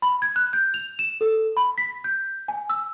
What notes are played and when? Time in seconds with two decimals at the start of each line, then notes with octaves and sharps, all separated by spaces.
0.02 B5
0.22 G#6
0.36 F#6
0.53 G6
0.74 F7
0.99 E7
1.21 A4
1.57 B5
1.78 B6
2.04 G6
2.48 G#5
2.70 E6